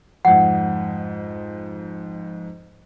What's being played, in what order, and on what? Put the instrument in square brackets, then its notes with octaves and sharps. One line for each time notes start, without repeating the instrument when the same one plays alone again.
[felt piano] F2 G#2 [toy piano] F#5